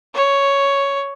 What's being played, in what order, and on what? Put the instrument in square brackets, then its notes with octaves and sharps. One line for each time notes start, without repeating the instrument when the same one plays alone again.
[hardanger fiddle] C#5